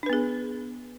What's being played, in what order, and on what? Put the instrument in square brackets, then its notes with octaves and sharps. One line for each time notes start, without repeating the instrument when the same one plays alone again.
[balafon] D4
B4
B3
G#4